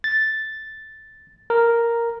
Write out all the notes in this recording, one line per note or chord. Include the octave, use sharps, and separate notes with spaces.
A6
A#4